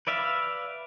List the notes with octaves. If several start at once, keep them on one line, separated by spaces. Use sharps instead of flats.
B4 D5 E5 F5